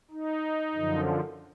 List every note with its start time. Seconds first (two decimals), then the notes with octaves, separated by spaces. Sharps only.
0.11 D#4
0.75 F#2 D3 F3